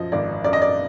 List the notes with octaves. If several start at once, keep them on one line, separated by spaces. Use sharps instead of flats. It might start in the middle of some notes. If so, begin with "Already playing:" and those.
Already playing: F#2 F3 D#5
G#1 D5
F#2 D5
D#5
D5